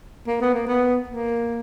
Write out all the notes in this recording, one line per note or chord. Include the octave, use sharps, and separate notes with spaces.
A#3
B3
A#3
B3
A#3